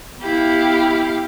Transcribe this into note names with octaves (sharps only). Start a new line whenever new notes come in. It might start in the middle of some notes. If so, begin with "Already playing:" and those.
B3 E4 G4 F5